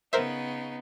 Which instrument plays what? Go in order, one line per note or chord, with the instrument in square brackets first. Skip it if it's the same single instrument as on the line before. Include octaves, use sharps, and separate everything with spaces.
[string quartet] C#3 B3 D#4 [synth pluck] A#4 C5 E5